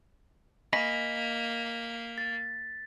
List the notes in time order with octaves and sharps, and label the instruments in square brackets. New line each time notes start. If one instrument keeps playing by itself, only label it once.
[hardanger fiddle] A#3 [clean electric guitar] D#5 G#5 B5 [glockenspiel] B6
[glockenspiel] A6